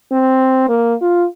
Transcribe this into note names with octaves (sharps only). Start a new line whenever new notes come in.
C4
A#3
F4